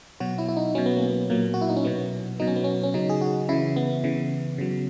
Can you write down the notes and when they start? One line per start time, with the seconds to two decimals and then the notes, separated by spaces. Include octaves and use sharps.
0.20 B2 F#3 F#4
0.38 E4
0.48 E4
0.57 D#4
0.75 B2 F#3 C#4
0.86 B3
0.97 A#3
1.08 B3
1.30 A#2 F#3 A#3
1.54 F#4
1.61 E4
1.69 D#4
1.77 C#4
1.85 B2 F#3 B3
2.40 B2 F#3 D#4
2.47 C#4
2.56 B3
2.64 C#4
2.83 C#4
2.94 C#3 F#3 D#4
3.09 G#4
3.22 F#4
3.49 C#3 E3 E4
3.76 B3
4.04 C#3 E3
4.58 C#3 F#3